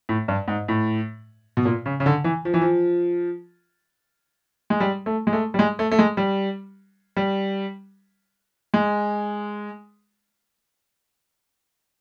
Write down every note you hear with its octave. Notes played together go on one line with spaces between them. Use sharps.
A2
G2
G#2
A2
B2
A#2
C#3
C#3
D3
E3
F3
E3
F3
G#3
G3
A3
G#3
A3
G3
G#3
A3
A3
G#3
G3
G3
G#3